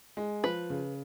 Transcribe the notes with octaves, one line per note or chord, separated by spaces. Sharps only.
G#3
F3 B4
C#3